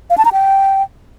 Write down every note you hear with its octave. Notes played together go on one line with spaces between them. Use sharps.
F5
A5
A#5
G5